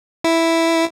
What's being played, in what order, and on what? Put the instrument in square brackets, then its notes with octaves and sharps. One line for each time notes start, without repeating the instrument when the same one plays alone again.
[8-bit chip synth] E4